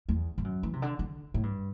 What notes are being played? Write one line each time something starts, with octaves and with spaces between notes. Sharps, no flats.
E2
G2
F#2
E3
C3
D3
D3
A2
G2